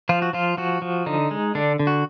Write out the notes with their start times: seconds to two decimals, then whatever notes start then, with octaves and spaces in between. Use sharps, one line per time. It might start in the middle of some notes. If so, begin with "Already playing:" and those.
0.09 F3 F4
0.22 F#4
0.33 F3 F4
0.57 F3 F#4
0.82 F3
1.06 D3 D#4
1.31 G#3
1.55 D3 D4
1.79 D3
1.87 F#4